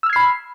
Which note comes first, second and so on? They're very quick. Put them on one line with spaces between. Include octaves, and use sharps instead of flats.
E6 F6 G#6 C7 B5